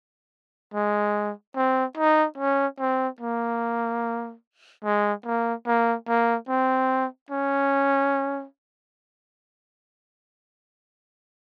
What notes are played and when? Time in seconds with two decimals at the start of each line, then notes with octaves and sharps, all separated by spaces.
0.74 G#3
1.56 C4
1.98 D#4
2.38 C#4
2.80 C4
3.21 A#3
4.84 G#3
5.25 A#3
5.67 A#3
6.08 A#3
6.49 C4
7.31 C#4